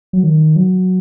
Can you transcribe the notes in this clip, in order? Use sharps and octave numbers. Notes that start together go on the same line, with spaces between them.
F#3
D#3
F#3